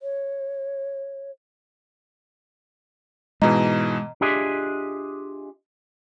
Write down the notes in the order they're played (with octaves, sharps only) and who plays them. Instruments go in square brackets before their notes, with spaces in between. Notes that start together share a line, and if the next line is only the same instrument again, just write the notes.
[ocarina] C#5
[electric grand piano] G#2 B2 E3 [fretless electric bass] G#3 [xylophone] D#5 A#5
[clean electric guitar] D4 F4 G4 G#4 D#5 E5